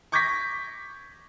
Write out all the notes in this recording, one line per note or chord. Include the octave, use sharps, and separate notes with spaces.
C#6 D6 G6 G#6 A#6 B6